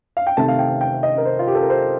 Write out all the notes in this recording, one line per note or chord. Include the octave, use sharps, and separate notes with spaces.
F5
G5
C3 D#3 A3 C4 A5
F5
G5
G5
D#5
A#4
C5
F4
G4
A4
A#4
C5